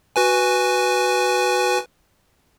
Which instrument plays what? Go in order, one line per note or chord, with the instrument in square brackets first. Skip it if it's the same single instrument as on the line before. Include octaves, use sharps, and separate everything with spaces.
[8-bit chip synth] F#4 B4 G#5